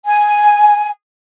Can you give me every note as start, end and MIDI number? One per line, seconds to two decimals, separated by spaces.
0.05 0.88 80